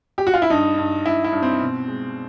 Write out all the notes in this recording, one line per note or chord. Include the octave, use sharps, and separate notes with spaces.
G4
F#4
F4
E4
G2 D#4
G2
G2 E4
E4
G2
C4
B2
G#3